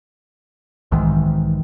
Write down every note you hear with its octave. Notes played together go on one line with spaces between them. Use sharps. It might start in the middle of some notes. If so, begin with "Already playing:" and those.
B1 G#2 D#3 E3